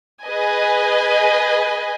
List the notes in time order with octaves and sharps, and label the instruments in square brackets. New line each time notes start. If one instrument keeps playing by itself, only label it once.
[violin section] G#4 B4 D#5 G#5